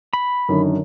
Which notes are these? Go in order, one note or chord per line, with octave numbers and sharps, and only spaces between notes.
B5
F#2 D3 D#3